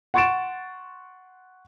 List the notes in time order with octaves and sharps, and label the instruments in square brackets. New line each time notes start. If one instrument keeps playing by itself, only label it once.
[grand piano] F#5 C6 C#6 A6 D7 E7